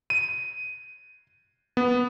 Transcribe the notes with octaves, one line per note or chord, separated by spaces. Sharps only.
D#7
B3